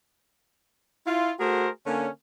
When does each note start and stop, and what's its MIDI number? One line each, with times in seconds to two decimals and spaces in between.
1.06 1.32 64
1.06 1.32 65
1.39 1.69 57
1.39 1.69 66
1.39 1.69 68
1.39 1.69 70
1.39 1.69 72
1.86 2.09 50
1.86 2.09 58
1.86 2.09 61